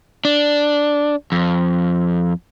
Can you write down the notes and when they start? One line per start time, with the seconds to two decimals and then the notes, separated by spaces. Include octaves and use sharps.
0.25 D4
1.32 F2